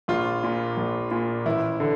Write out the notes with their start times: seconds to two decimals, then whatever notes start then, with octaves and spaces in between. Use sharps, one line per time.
0.08 A#1 F4
0.43 A#2
0.77 A#1
1.11 A#2
1.46 A1 E4
1.80 D3